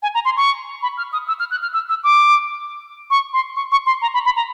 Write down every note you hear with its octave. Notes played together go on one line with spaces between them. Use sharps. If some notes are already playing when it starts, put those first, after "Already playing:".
G#5
A#5
C6
C#6
B5
F6
D#6
E6
F6
F#6
F6
E6
E6
D6
C#6
C6
C#6
C#6
C6
A#5
B5
B5
A#5